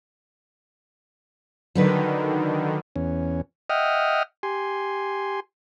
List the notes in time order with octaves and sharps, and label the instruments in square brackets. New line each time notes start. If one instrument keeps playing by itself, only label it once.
[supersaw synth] D3 D#3 [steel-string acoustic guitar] F#3 D#4 B4
[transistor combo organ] E2 C#4
D#5 E5 F#5 G5 D#6 F6
G4 G#5 C6